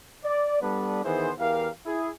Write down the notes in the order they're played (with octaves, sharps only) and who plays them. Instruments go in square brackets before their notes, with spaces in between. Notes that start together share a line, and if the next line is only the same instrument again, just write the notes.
[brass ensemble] D5
G3 B3 D4 A4 B4
D#3 E3 B3 G#4 C5
E2 E3 G4 A#4 F5
E4 G#4